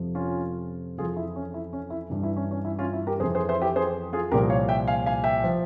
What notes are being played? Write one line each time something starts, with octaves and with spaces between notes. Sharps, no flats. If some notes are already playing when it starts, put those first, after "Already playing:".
Already playing: F2 C3 F3
C#4 F4
F2 E3 F4 G#4
E4
C#4
E4
C#4
E4
G2 E3
E4
C#4
C#4
E4
C#4 F4
E4
G4 A#4
F2 E3 G#4 C5
G#4 C5
C5 E5
E4 G4
G#4 C5
F4 G#4
C2 A#2 F3 G4 A#4
C#5 F5
E5 G5
F5 G#5
F5 G#5
E5 G5
F3